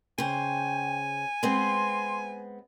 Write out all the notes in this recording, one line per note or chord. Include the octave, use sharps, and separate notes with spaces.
C#3 C5 G5 G#5
G#3 B3 C4 C6